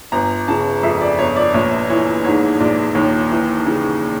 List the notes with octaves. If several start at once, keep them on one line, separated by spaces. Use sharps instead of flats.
G1 A#5
C#3 A5
F2 E5
D5
G1 C#5
D5
A#1 C#5
E3 C#5
G#2 C#5
A#1 D5
D#2 C#5
E3
C#3